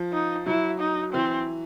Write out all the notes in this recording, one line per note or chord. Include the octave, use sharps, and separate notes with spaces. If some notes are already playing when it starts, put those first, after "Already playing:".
Already playing: F3
D#4
F#3 E4
D#4
E3 C4